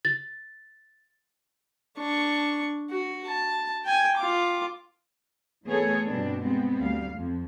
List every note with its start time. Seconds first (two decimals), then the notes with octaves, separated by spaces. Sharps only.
0.05 A6
1.98 D4 C#6
2.90 F#4
3.26 A5
3.85 G5 G#5
4.17 F4 D6
5.65 E3 A3 B3 G#4 A4 C#5
6.05 G2 B2 B3 C4 D4
6.39 G#3 B3 C4
6.77 D2 G3 F5
7.14 F2 F3